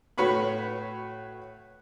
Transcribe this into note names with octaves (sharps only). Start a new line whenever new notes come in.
A2 F#4 B4 C#5 B5